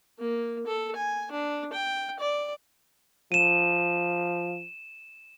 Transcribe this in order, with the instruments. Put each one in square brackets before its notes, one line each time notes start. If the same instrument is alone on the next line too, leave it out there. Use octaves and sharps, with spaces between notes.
[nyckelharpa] A#3
A4
G#5
D4
G5
D5
[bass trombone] F3 [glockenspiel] D#7 E7